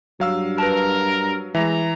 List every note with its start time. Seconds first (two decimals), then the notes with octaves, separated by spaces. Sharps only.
0.20 G2 F#3 F5 E6
0.58 A#4 B4 A5
1.55 E3 G#3 E5 A#5